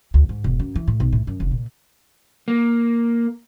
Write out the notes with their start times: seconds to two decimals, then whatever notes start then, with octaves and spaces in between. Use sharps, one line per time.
0.14 D2
0.29 G#2
0.44 E1
0.60 F#2
0.76 E3
0.88 A2
1.00 B1
1.12 A2
1.27 F#2
1.40 F1
1.51 A#2
2.48 A#3